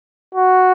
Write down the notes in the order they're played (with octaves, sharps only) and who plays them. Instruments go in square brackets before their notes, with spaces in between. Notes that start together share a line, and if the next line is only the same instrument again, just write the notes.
[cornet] F#4